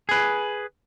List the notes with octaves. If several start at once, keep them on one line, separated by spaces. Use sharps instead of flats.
G#4 B4